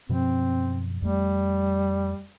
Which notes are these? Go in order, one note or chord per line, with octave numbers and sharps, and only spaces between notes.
F#2 B2 F3 C4
F2 G3 A3